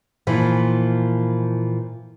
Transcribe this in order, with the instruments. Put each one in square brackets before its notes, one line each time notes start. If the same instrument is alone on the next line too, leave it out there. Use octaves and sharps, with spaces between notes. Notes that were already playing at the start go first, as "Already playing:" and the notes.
[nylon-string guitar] A#2 E3 F3